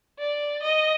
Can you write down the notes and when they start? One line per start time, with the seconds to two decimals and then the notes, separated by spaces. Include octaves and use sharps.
0.19 D5
0.62 D#5